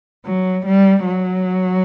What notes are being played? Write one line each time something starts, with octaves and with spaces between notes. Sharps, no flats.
F#3
G3
F#3